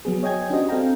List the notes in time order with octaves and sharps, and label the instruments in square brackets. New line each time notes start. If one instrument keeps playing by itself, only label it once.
[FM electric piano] F#3 B3 G#4
C#5 D#5 G5 G#5 G#6
C#4 D4 F#4 G4 C5 D#5
C4 A4 F5 G5 A#5